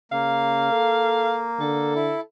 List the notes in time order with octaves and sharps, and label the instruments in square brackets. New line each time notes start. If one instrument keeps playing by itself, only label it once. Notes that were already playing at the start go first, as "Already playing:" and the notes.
[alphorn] C#3 [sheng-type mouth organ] A#3 [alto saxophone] F5
[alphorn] A4
[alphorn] D3 [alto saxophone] A4
[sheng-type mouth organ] E4